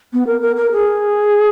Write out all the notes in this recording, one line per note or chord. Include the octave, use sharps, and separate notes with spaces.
B3
A#4
A#4
A#4
G#4